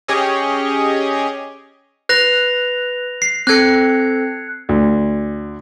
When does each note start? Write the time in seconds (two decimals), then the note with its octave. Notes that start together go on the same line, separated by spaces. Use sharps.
0.08 C#4 G4 G#4 C#5 D#5
2.09 B4 F#6 A#6 F7
3.22 C7
3.47 C4 A4 F#6 G#6 C#7
4.69 D2